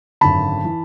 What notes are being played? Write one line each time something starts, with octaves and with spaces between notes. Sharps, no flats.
G#1 F#2 D3 A5 B5
E3